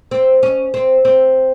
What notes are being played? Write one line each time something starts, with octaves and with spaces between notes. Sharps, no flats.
C4
C#4
C4
C4